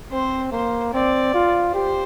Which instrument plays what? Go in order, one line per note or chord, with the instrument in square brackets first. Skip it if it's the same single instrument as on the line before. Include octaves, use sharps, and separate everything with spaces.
[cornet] C4 [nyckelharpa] C5
[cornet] A#3 [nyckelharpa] C5
[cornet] C4 [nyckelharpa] D5
[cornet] F4
[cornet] G4 [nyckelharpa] C5